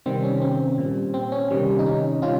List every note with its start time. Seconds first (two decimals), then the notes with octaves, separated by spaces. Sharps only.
0.06 C3 D#3 G3 C4
0.23 C#4
0.42 C4
0.78 A#2 G3
1.14 C4
1.32 C#4
1.51 C3 D#3 G3
1.79 D#4
1.86 C#4
2.22 C3 G3 C#4 F4